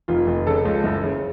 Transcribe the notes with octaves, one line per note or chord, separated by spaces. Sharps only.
F1 F4
F1
C#3 A4
C#2
F#1
C#3